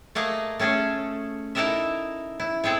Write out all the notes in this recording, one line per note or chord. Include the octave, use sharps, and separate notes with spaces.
A3 A#3 G#4 D#5
A3 C#4 G#4 A4
D#4 E4 A4 A#4 D#5 E5
E4
G#3 C4 G#4 A4